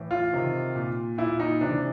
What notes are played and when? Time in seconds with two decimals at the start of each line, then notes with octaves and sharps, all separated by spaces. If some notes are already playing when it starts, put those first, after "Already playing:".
Already playing: A2 E3
0.11 F4
0.33 C3 D#3
0.75 A#2
1.18 A#2 E4
1.40 D#4
1.61 C3 E3 D4